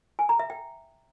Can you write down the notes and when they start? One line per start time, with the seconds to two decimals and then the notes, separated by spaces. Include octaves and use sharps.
0.19 G#5
0.29 A#5
0.39 E5
0.50 G5